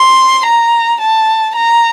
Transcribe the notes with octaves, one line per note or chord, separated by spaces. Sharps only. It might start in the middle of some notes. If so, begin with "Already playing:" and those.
Already playing: C6
A#5
A5
A#5